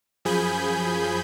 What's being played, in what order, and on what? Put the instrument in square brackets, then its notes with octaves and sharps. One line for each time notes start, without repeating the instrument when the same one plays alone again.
[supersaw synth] F#2 F3 G#4 G#5 B5 G6